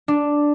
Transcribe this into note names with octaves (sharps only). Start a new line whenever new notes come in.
D4